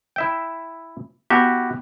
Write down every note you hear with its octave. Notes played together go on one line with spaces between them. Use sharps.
E4 E5 G5
B3 E4 F#4 G4